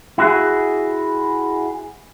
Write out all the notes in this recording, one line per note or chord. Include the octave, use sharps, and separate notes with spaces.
E4 F#4 G#4